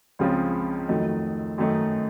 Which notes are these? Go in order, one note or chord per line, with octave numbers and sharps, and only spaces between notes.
C#2 C#3 F3 C4 F4
F2 D#3 F#3 A3 D#4
F#2 D#3 A3 D#4